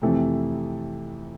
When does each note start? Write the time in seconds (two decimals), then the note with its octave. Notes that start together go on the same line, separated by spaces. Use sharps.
0.02 F2 C3 E3 A3